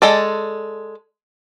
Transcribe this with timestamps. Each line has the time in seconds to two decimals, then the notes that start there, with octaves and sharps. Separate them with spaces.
0.02 G#3 A4 D5